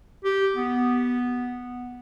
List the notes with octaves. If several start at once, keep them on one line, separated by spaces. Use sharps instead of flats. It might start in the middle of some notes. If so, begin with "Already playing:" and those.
G4
B3